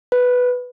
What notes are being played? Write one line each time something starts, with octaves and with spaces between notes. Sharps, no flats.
B4